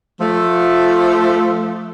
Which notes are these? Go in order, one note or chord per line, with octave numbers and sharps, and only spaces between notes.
F3 A3